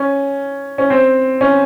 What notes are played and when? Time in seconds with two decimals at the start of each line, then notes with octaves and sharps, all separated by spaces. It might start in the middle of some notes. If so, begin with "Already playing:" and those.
Already playing: C#4
0.78 C#4
0.90 C4
1.41 C#4